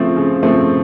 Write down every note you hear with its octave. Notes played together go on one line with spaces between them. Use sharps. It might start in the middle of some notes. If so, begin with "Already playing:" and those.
Already playing: C#3 F3 A3 C4
C#3
F3 A3 C4